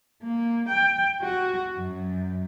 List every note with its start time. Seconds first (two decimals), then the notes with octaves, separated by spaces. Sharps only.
0.22 A#3
0.69 G5
1.22 F#4
1.77 F#2